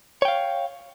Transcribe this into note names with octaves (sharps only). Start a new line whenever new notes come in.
C#5 F5 G5